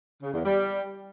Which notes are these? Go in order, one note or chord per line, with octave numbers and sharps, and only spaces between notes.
C#3
E2
G3